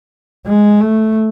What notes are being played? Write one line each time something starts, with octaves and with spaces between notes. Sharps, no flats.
G#3
A3